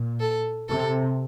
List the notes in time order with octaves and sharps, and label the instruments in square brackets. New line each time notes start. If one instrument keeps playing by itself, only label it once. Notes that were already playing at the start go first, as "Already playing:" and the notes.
Already playing: [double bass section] A#2
[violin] A4
[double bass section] C3 [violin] A4